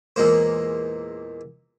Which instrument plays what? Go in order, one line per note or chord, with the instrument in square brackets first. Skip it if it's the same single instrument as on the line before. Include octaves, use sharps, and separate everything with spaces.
[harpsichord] E2 A#2 G#3 A#3 C5